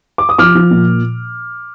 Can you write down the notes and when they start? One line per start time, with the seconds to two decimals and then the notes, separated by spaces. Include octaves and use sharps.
0.18 D6
0.29 D#6
0.38 F3 D6 F6
0.55 F3
0.71 A#2